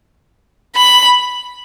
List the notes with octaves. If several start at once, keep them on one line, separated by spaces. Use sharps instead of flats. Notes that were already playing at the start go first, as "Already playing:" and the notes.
B5